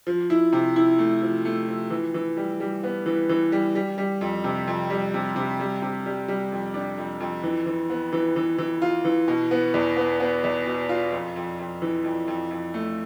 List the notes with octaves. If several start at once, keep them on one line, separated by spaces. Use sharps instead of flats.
F3
E4
C3
E4
A3
F3
A3
F3
E3
E3
G3
G3
B3
E3
E3
G3
G3
G3
F2
C3
F2
G3
C3
C3
G3
C3
G3
G3
F2
D4
F2
F2
E3
E3
B3
E3
E3
E3
F4
E3
B2
B3
E2
B3
B3
E2
B2
F4
F2
F2
F2
E3
F2
F2
F2
A3